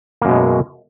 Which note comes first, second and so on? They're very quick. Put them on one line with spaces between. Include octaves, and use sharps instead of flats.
A#3 F#2 B2 G#3